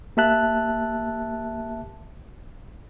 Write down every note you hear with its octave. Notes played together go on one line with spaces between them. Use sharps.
A#3 G4 E5 A5 F#6